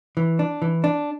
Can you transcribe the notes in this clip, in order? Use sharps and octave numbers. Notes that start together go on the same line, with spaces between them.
E3
D4
E3
D4